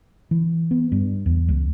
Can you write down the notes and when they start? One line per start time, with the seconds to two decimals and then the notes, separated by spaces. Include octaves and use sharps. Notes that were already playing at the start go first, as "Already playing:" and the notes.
0.31 E3
0.71 B3
0.92 G2
1.26 E2
1.49 C#2